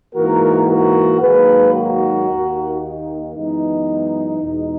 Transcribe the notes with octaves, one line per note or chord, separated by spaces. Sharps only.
G#2 E3 A#3 F#4 A#4
F#4 A#4
G#2 D#3 F#3 A#3 G#4 B4
F#4 A#4
D#2 D#3 A#3
D#4
F#2 E3 G#3 B3 D#4
E2 B2 G#3